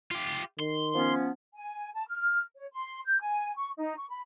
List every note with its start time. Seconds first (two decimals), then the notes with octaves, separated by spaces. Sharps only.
0.11 F4 G4
0.59 D#3 C6
0.95 F3 B3 C#4
1.55 G#5
1.94 A5
2.08 F6
2.55 C#5
2.72 C6
3.05 G6
3.21 G#5
3.57 C#6
3.77 D#4
3.97 C#6
4.10 B5